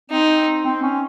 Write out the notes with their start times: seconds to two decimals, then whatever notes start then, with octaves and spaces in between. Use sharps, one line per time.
0.10 C4 D#4
0.66 C4
0.83 C#4